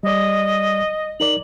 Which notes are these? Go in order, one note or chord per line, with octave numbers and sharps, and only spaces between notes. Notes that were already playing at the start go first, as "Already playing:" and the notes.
G3 D5 D#5
D#4 A#4 D5 F#7